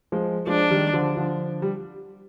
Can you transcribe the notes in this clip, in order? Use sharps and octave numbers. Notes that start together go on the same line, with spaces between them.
F3 G#3
F3 G#3 D4
D#3 G3
D3 F3
D3 F3
G3